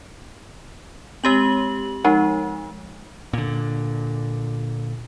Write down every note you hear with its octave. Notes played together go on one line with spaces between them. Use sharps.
G#3 C4 G4 F#7
F3 G#3 D#4 F#5
A#2 D3